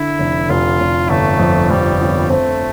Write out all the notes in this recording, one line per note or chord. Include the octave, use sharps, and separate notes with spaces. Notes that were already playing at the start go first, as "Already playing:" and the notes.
Already playing: D3 E4
F1
F1 F4
F1
G1 A3
F2
F2 G3
G1
A3 C4